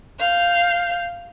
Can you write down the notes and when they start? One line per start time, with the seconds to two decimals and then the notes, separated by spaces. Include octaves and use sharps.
0.20 F5 G6